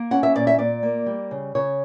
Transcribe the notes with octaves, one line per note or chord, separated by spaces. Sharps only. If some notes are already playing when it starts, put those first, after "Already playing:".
Already playing: A#3
C#4 F#5
E5
A#2 D5
E5
A#2 D5
A#3
G3
C#3
C#3 C#5